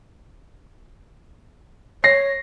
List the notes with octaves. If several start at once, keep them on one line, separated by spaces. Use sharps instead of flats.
C#5 A#6 C7